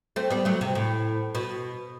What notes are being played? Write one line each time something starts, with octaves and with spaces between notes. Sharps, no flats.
A3 C4
G3 B3
F#3 A3
C3
A2
B2